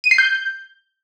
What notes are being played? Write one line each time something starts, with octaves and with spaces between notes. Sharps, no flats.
D#7
C7
G6